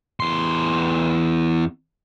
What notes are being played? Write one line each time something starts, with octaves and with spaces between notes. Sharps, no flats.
E2 C6